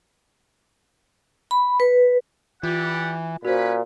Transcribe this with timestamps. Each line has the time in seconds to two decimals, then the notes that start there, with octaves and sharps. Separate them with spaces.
1.51 B5
1.80 B4
2.63 E3 F4 G4 D5 F#5
3.45 A#2 C#4 F#4 B4 C5 B5